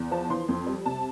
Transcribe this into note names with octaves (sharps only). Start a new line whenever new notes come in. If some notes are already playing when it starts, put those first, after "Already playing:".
Already playing: E2
F3 A5
E3 C6
F2
G3
C3 A5